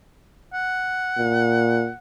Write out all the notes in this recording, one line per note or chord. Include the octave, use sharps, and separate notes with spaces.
F#5
A#2